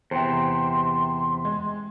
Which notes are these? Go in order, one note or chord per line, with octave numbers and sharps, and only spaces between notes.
E2 C3 C5 G5 C6
G#3